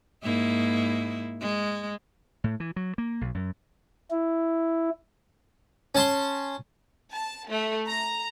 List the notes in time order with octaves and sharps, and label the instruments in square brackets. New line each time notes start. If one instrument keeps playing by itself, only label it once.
[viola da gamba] G#2 A#3 E4
G#3
[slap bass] A2
E3
F#3
A#3
B1
F#2
[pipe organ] E4
[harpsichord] C#4 A5 C6
[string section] A5
A3
A#5